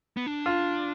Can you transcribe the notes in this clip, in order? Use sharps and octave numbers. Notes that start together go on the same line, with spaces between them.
B3
D4
F4